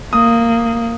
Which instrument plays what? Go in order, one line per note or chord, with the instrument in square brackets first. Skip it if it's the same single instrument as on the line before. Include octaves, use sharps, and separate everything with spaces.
[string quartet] A#3 [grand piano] D#6